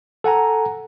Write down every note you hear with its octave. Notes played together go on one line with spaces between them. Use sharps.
A4 F#5 G#5 A#5